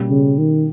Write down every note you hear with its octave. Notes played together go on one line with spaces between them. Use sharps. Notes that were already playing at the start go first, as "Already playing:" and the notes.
Already playing: B2 G3 A#3 C#4
C#3
D#3